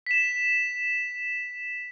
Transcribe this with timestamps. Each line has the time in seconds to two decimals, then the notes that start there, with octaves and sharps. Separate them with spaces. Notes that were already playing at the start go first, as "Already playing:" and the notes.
0.06 B6 E7